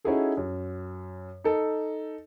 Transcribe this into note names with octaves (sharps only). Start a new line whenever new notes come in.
C#4 D#4 E4 F#4 G#4 A4
F#2
D#4 A4